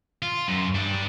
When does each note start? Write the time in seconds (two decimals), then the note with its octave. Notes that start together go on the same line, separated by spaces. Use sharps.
0.22 F4
0.48 F#2
0.75 G2 D4